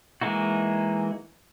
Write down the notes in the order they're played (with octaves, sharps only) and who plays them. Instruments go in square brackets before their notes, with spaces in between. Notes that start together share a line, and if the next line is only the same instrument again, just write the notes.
[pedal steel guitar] E3 G#3 A#3 D#4 F#4